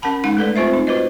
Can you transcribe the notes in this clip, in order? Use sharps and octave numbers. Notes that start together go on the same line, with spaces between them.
C#4 A#4 F#5 A5 B5
G#3 D#4 F#5
A3 A4 B4 D5
C4 F4 C5 E5
D#4
F4 F#4 B4 C5 D#5